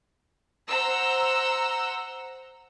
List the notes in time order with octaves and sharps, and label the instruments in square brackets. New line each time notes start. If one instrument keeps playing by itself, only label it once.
[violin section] C5 F#5 A#5 E6